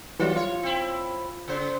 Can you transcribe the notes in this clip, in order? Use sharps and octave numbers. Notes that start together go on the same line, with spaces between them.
E3 F#3 G3 A#3 F4
F4 C#5
C4 E4
C#3 C5